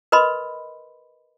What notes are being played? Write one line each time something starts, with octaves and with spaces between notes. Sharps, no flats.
A#4 B4 D#5 B5 C6